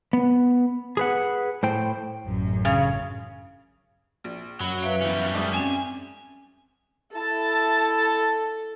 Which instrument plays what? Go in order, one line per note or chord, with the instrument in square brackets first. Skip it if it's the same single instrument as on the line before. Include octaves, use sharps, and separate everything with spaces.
[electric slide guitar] B3
G#4 B4 F#5
A2 C5 G5
[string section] A1 F#2
[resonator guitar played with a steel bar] C#3
[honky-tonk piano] A#1
[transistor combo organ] F#2 [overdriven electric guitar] F#3 [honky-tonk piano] B5
[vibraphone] B4 E5 F5 [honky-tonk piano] F#6 D7
[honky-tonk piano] E3 B3 [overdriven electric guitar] G3 C#4
[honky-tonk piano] G#2 D5 E5 [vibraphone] A5 D#6
[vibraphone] C4 C#4 [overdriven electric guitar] G#5
[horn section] E4 A5 [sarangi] A4